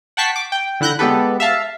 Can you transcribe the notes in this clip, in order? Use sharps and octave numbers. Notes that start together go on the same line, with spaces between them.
F#5 G5 A5 C#6 B6 C7
D6
G5
D3 E4 F#6 G6 A#6
G#3 B3 G4 A4 B4
E5 F5 A5